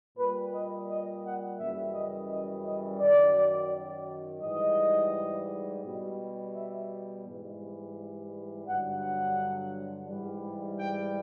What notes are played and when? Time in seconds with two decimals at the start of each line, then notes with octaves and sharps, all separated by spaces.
0.17 A#2 G3 B4
0.52 D#5
0.89 D#5
1.23 F#5
1.59 F#2 C#3 E3 G3 E5
1.94 D#5
2.30 D#5
2.65 D#5
3.00 F#2 D#3 F#3 D5
4.42 G#2 E3 G3 D#5
5.83 B2 G3
6.54 E5
7.25 G#2 E3 G3
8.65 G2 D3 F#3 F#5
9.01 F#5
10.07 G#2 E3 G3
10.78 G5